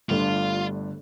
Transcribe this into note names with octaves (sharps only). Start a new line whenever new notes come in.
G1 G2 D3 A3 D4 F4